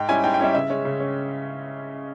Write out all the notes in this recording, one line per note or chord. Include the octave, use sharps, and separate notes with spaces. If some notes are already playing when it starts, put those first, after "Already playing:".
Already playing: G#2 G5
G3 C#4 E4 G#5
G#2 G5
G5
G3 C#4 E4 E5
C#3 E5
G#3 C#4
C#3
C#4